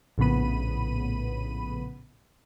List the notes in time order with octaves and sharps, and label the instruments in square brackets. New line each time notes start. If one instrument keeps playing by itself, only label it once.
[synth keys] A#1 A2 C#3 B3 B5 D#7